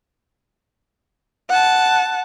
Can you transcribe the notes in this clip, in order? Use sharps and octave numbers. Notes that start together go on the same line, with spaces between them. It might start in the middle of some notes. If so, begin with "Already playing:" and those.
F#5 A5